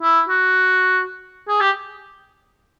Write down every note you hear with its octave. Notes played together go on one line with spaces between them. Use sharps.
E4
F#4
G#4
G4